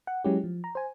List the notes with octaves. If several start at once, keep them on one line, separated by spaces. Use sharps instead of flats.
F#5
F#3 G#3 C#4 E4 G4
F3
A#5
C5 G#5